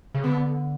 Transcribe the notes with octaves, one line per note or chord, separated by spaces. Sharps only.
C#3
D3 B3